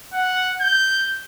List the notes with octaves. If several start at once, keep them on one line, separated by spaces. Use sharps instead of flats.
F#5
G6